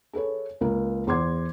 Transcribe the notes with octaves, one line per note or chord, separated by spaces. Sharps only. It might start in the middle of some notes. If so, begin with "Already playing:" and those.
G#4 A4 B4 C#5
C#2 A#3 A#4
E2 G#4 C5 C6 D6 G#6